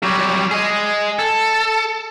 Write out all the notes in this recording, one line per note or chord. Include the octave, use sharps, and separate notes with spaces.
F#3 G3
G#4 D#5
A4